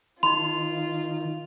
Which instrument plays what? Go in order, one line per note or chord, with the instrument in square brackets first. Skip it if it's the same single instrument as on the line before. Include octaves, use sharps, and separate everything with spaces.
[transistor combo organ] D#3 [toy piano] D#4 C6 [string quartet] F4 [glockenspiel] F7